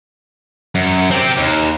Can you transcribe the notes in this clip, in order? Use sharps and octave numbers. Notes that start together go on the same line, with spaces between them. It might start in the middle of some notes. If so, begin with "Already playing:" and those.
F#2
C4 G4
D#2